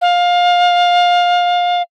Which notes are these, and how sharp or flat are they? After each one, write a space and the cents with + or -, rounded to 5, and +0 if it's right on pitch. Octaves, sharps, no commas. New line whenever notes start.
F5 +20